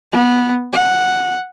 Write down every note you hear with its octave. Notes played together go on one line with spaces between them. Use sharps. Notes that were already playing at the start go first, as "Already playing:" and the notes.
B3
F#5